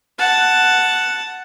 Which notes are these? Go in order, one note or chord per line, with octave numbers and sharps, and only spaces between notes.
F#5 A5